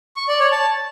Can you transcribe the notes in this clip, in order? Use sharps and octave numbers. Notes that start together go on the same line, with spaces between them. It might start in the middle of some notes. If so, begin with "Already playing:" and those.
C#6
D5
C#5
A5